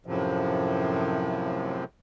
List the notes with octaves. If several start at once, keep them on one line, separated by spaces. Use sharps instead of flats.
F#2 A2 C3 F3